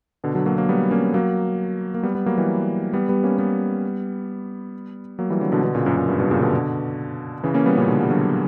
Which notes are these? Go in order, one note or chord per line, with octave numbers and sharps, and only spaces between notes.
B2 D3
D3 F#3
F#3 A#3
F#3 A#3
G3 B3
A#3 C#4
F#3 A#3
A#3
G3 B3
G3 B3
F#3 A#3
E3 G3
G3 B3
G3 B3
A#3 C#4
G3 B3
F#3 A#3
E3 G3
D3 F#3
B2 D3
B2 D3
A#2 C#3
F#2 A#2
F#2
G2
G2 B2
A#2 C#3
B2 D3
C#3 E3
A#3 C#4
G3 B3
A#2 C#3
B2 D3
G3
D3 F#3